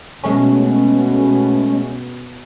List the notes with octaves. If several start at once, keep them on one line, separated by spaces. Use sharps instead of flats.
B2 G#3 A3 C#4